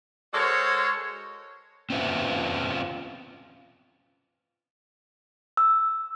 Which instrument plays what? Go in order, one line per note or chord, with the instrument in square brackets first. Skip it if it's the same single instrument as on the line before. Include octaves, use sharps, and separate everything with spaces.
[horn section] G#3 F#4 A4 A#4 C5 C#5
[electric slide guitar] C4 C#4 F4 B4 C5 E5
[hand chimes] E6